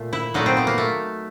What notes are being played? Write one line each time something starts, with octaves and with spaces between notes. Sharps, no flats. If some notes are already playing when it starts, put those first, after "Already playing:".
Already playing: A#2 A3
E4
A#2 F#3 A3 D#4
C4
B3
A#3
A3